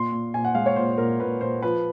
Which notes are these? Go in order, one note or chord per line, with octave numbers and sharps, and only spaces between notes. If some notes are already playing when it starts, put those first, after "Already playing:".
Already playing: A#2 C6
A#2
A#2 G#5
F#5
G#3 F5
C#5
A#2 C5
A#2 A#4
A#2 B4
A#2 C5
F3 B4